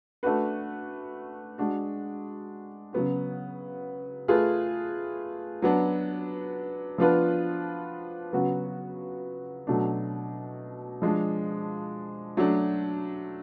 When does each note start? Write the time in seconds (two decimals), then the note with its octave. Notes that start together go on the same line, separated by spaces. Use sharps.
0.23 A3 D4 F#4 B4
1.58 G#3 D4 F#4
2.93 C#3 F#3 B3 F#4
4.28 A3 F4 G#4 B4
5.62 F#3 B3 D4
6.98 F3 B3 D4 F4 B4
8.33 C#3 F#3 B3 F#4
9.67 B2 F#3 A3 D4
11.02 F3 G#3 D4
12.37 F#3 A3 D4